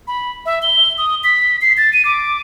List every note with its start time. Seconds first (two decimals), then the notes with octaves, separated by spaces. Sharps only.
0.07 B5
0.46 E5
0.62 G7
0.98 D#6
1.24 B6
1.62 C7
1.77 A6
1.93 D#7
2.05 D6